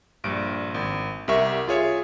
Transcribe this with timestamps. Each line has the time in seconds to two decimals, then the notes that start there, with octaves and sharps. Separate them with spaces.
0.24 A#1 G2 D7
0.74 G#1
1.28 C2 G4 A#4 E5 C#6
1.68 F4 G#4 C#5 E5